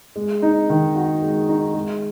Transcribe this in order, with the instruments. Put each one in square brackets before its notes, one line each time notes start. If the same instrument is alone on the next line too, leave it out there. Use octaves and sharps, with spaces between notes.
[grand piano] G#3
D#4
D#3
F#4
G#3
D#4
G#3